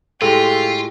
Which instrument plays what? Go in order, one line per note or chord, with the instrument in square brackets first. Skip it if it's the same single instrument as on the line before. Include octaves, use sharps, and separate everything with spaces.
[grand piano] A2 G#3 [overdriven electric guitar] F4 [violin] G4 [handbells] A4